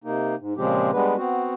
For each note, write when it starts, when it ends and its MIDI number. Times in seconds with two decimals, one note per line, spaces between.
0.04 0.35 48
0.04 0.35 58
0.04 0.35 63
0.40 0.54 44
0.57 0.91 46
0.57 0.91 49
0.57 0.91 53
0.57 0.91 56
0.57 0.91 60
0.57 0.91 67
0.93 1.16 55
0.93 1.16 56
0.93 1.16 59
0.93 1.16 62
0.93 1.16 71
1.17 1.54 59
1.17 1.54 60
1.17 1.54 66